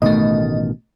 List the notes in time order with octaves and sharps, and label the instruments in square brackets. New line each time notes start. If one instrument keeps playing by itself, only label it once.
[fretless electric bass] A1 B2 D#3 [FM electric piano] A3 D#5